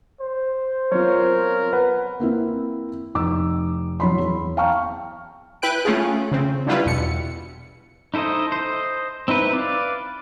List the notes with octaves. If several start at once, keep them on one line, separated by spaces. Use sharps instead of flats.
C5
F#3 B3 C4 F4 A#4 C#5
B4 F#5
A#3 C4 E4
F1 D#4 D6 E6
F#3 C#5 B5 C6
E2
F5 G5 A5 A#5 C#6 F6
E4 B4 G5 F#6 D7
A3 C#4 F4 G#4
C#3 C4
D3 F#3 G3 E4 F4 B4
E2 B2 C#7
D#4 E4 A4 C5 D#5
C5 D#5
C4 D#4 E4 B4
B4 D5 F5